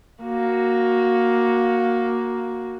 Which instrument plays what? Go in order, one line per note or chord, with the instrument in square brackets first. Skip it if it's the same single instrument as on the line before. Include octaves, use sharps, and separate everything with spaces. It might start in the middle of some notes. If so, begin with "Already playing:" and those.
[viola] A#3 F#4